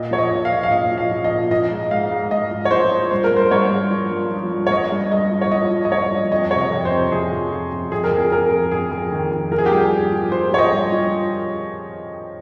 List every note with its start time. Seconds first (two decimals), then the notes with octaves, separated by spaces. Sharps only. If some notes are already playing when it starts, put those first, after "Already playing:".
Already playing: A#2 D#5
0.11 F3 C#5
0.18 D#5
0.31 A#2
0.45 F5
0.52 F3
0.63 F5
0.71 A#2 D#5
0.91 F3
0.98 F5
1.11 F3
1.24 D#5
1.31 A#2
1.51 F3 D#5
1.71 G#2
1.91 G#2 F5
2.11 G#2
2.31 G#2 D#5
2.51 F3
2.65 C#5
2.71 F3 C5
2.91 F3
3.11 G2 C5
3.24 A#4
3.32 G2
3.37 C5
3.51 G2 C#5
3.71 G2
3.91 F3
4.11 G2
4.31 F3
4.52 G2
4.67 C#5
4.71 G2 D#5
4.92 G2
5.12 G2 D#5
5.31 F3
5.41 C#5
5.51 F3 D#5
5.71 F3
5.85 D#5
5.91 G2 C#5
6.11 F3
6.32 F2 D#5
6.51 C3 C#5
6.58 D#5
6.72 F2
6.85 C5
6.91 C3
7.12 F3 G#4
7.32 F2
7.52 F2
7.72 F2
7.92 F2 G#4
8.04 A#4
8.11 F2 G#4
8.31 F2 A#4
8.52 F2
8.72 F2 G#4
8.91 F2
9.12 D#3
9.31 F2
9.51 F3 A#4
9.58 G#4
9.66 G4
9.72 G2 G#4
9.92 F3
10.12 F3
10.32 F3 C5
10.51 F3 C#5
10.58 D#5
10.72 G2
10.92 F3